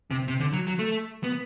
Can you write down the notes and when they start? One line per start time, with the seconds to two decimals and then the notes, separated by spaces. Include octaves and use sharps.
0.11 C3
0.28 C3
0.40 D3
0.53 F#3
0.67 F#3
0.79 A3
1.24 B3